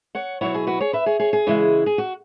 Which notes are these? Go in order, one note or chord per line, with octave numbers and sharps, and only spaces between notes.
C#5 F#5
B2 F#3 E4 C#5 F#5
G#4
F#4 B4
G#4 C#5
B4 E5
G#4 C#5
G#4 C#5
G#4
C#3 E3 G#3 E4
G#4
F#4